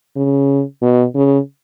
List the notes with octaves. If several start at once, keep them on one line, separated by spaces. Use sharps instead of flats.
C#3
B2
C#3